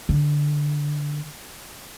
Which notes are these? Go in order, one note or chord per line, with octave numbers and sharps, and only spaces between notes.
D3